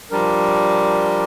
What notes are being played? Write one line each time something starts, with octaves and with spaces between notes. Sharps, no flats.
F3 G3 D4 A#4